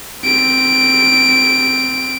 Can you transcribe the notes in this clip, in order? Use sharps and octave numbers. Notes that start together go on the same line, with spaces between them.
C4 D7